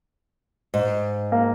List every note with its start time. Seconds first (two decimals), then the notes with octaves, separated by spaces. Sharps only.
0.74 G#2
1.32 A#3